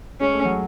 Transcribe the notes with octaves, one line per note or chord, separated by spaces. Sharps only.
G#3 C#4
A3
F#3